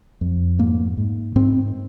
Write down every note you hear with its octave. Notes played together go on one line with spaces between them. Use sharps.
F2
G#2 A#3
G#2
G#2 C4